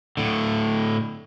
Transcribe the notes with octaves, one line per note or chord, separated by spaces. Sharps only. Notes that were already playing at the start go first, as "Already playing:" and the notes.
A2 D3